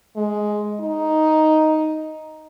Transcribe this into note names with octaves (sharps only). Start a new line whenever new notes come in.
G#3
D#4